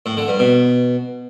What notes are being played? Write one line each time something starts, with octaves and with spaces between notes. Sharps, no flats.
A2
D3
G2
B2